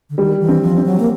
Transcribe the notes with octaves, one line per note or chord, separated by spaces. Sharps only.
D3
D#3 G3
E3
C4
F3
C4
F#3
A#3